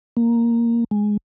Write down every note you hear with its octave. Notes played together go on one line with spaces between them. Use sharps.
A#3
G#3